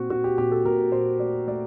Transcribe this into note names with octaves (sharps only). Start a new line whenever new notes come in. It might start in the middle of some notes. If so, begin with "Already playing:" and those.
Already playing: A#2 C4 F#4
A#2 F#4
G4
A#2 G4
A4
A#2 A#4
A#2 C5
A3 D5
A3 D5